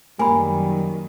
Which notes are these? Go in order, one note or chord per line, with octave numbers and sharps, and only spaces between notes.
F#2 D#3 G3 A#3 G#5 B5